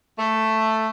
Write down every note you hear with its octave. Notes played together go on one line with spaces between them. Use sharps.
A3